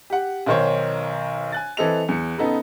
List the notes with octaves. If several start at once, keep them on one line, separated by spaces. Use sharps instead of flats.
G4 F#5
B1 D#3 C5 C#5
G#5 F#6 A6
E3 C4 A4 D#5 F7
E2 C#7
C#3 B3 D#4 A4 B4